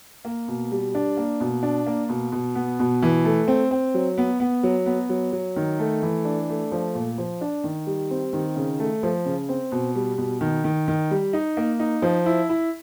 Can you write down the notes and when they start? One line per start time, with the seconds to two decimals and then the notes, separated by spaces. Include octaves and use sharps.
0.25 A#3
0.48 B2
0.71 G3
0.95 D4
1.17 A#3
1.40 B2
1.63 D4
1.86 A#3
2.09 B2
2.32 B2
2.55 B3
2.79 B2
3.03 E3
3.25 A3
3.48 C4
3.71 C4
3.94 F#3
4.18 B3
4.40 B3
4.63 F#3
4.86 B3
5.09 F#3
5.32 F#3
5.56 D#3
5.79 A3
6.03 E3
6.25 D4
6.49 A3
6.72 F3
6.95 A#2
7.18 F3
7.41 D4
7.64 D#3
7.87 G3
8.11 C4
8.33 D#3
8.56 C#3
8.80 A3
9.03 F3
9.26 C#3
9.49 C4
9.72 B2
9.95 G3
10.18 B2
10.41 D#3
10.64 D#3
10.88 D#3
11.11 G3
11.33 D#4
11.57 A#3
11.80 D#4
12.02 F3
12.26 E4
12.49 E4